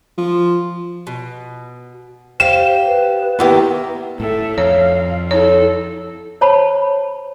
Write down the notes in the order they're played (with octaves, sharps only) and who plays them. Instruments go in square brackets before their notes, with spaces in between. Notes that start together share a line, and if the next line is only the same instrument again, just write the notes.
[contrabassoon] F3
[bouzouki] B2
[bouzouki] G4 F5 [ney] C5 [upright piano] E7
[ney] B4
[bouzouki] D#3 A#3 F4 [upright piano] B3 E4 G4
[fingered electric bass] A2 [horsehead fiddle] A4 E5
[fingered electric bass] F2 [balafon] C#5 [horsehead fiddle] F5
[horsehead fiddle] E4 A4 [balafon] C#5
[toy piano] C5 C#5 A5 B5